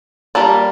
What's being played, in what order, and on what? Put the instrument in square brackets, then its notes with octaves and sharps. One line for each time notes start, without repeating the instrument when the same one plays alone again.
[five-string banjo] G3 A#3 D4